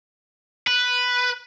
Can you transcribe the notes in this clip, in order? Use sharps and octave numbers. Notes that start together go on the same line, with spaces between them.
B4